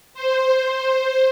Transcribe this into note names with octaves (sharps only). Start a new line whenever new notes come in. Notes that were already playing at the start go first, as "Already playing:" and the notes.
C5